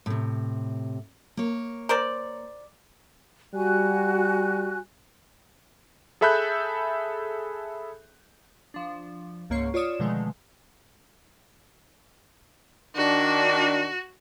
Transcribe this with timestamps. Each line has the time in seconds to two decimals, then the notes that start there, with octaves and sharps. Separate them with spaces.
0.06 A2 C3
1.37 A#3 C#5
1.89 A#4 C5 D5
3.54 G3 F#4 G#5 F#6
6.21 G#4 A4 E5 B5 F#6 G6
8.74 F3 D4
9.50 C#2 G#2 A#3 C#5 C#6 C7
9.74 F4 C#5 D5 D#6 E7
10.00 B2 D3 D#3 F3 G#3 A3
12.96 D#3 D4 F#4